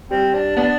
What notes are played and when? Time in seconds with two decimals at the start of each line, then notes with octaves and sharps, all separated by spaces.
0.11 G3 C4
0.34 D4
0.57 B3 D4